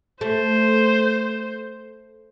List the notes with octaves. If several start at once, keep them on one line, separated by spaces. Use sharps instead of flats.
A3 C5